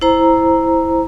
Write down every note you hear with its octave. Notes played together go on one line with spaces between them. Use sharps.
E4 C5 A#5